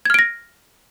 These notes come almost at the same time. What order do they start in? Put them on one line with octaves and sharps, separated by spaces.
G#6 F6 D7 A#6